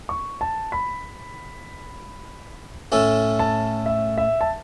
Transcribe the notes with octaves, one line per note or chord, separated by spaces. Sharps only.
C#6
A5
B5
A2 A3 C#4 A4
A5
E5
E5
A5